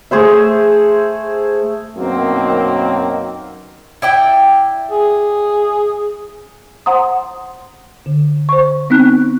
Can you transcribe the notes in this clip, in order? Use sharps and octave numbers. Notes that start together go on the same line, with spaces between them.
A3 G#4 C5 E5
F#2 B2 D#3 F#3 A#3 C4
E4 D5 G5
G#4
C5 F#5 A#5 C6 D#6
D3
C5 C#6
B3 C4 D#4 F#6